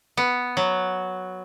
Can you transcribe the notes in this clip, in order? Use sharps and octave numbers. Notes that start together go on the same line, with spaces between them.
B3
F#3